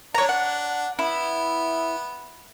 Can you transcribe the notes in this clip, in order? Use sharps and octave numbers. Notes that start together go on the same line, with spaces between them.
D4 C#5 A#5
F#5
B3 E4